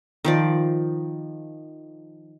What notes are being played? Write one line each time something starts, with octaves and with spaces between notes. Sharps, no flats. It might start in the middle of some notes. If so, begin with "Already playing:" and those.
D#3 F3 D5